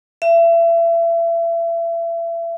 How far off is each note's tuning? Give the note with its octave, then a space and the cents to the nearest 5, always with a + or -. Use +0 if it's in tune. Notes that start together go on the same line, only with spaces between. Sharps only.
E5 +35